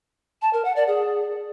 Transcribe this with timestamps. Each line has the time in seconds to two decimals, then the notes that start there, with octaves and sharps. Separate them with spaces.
0.42 A5
0.53 A#4
0.65 F#5
0.76 D5
0.87 G#4